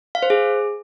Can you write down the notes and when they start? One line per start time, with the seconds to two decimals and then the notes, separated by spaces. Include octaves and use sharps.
0.15 F5
0.23 C5
0.30 G#4